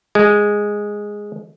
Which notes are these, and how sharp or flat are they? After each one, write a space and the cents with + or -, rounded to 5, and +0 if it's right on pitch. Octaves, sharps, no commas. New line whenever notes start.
G#3 -5